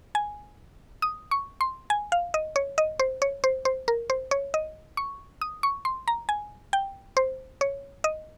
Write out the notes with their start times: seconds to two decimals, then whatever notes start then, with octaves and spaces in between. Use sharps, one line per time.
0.15 G#5
1.02 D#6
1.31 C#6
1.61 C6
1.90 G#5
2.12 F5
2.34 D#5
2.56 C#5
2.78 D#5
3.00 C5
3.22 C#5
3.44 C5
3.65 C5
3.88 A#4
4.10 C5
4.31 C#5
4.54 D#5
4.97 C#6
5.41 D#6
5.63 C#6
5.85 C6
6.08 A#5
6.29 G#5
6.73 G5
7.17 C5
7.61 C#5
8.04 D#5